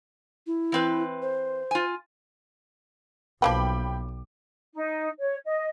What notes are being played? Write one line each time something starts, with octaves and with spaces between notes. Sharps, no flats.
E4
E3 C4 B4
C5
F4 G#5
B1 F3 A#3 B4 G5 B5 D6
D#4
C#5
D#5